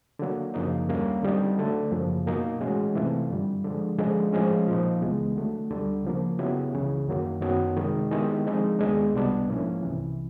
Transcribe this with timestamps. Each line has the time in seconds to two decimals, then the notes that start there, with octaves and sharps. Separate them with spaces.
0.19 D3 F#3 A#3
0.54 F#2 C#3 F3 A#3 D#4
0.88 D#2 D3 G3 A#3 C#4
1.23 D3 G3 C4 D#4
1.58 D3 F#3 A3 D4
1.92 F#2 C#3 F3 A#3
2.26 B2 F#3 A#3 D#4
2.61 A2 E3 G#3 C#4 F#4
2.95 C3 E3 A3 C4 F4
3.30 G2 D3 G3
3.64 D3 F3 G#3
3.98 D3 F3 G#3 C#4
4.33 A2 F3 G#3 C#4
4.67 A#2 F3 A#3 D#4
5.01 C#2 C#3 E3 G#3 B3
5.36 D3 F#3 A3
5.70 D2 D3 G3
6.05 C#3 F3 A#3
6.39 C#3 F#3 B3 E4 G4
6.73 C#2 C#3 E3
7.08 F#2 D#3 F#3 A#3
7.42 F#2 D#3 F#3 B3 D#4
7.76 C3 D#3 G#3
8.11 D#3 G#3 B3 E4 G4
8.46 D3 F3 G#3 C4 D#4
8.79 D#2 D#3 G#3 B3 D4
9.14 C2 B2 G3 B3 D4
9.48 G#2 F3 A#3 C#4 E4
9.83 C2 C3 E3